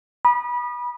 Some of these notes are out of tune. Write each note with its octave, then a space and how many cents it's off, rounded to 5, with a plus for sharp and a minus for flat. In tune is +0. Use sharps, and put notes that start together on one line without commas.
B5 -25 D#6 -35